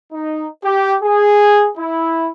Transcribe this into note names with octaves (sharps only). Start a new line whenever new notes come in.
D#4
G4
G#4
E4